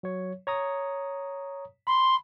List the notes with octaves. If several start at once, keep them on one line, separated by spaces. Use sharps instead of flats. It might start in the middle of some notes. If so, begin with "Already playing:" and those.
F#3 C#5
C#5 A#5 D#6
B5 C6